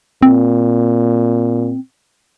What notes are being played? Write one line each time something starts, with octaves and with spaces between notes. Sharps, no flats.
A#2 C4